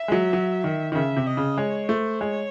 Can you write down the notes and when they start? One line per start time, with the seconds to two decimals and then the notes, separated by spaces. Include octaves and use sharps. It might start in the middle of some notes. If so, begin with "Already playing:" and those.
Already playing: E5
0.08 G#3
0.12 F#3
0.33 F#3
0.64 D#3
0.92 D#3
0.95 C#3 E5
1.17 C3
1.26 D#5
1.37 C#3
1.58 G#3 C#5
1.89 A3 C5
2.20 G#3 C#5